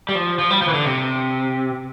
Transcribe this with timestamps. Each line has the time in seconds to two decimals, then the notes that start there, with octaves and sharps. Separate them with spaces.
0.09 G3
0.15 F3
0.39 F3
0.50 G3
0.62 F3
0.68 E3
0.74 D3
0.86 C3